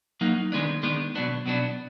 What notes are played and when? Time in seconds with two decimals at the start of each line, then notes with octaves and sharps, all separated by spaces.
0.21 F#3 A#3 D#4
0.52 D#3 G#3 B3 D4
0.83 D#3 G#3 B3 D4
1.15 B2 F#3 B3 D4
1.46 B2 F#3 B3 D4